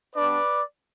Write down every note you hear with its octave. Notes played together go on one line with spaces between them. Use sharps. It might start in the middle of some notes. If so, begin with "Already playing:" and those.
G3 B3 D4 B4 D5